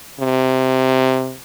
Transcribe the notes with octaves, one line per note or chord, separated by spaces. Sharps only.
C3